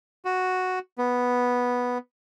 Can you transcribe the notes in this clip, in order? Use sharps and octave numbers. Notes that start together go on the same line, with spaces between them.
F#4
B3